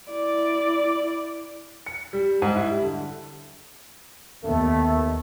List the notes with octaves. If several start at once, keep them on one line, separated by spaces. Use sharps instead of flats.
E4 D5
C#7
G3
G#2
E4
G3
D3
D#2 D#3 A3 B3